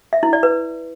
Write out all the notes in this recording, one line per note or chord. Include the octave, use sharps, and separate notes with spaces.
E5
E4
D5
B4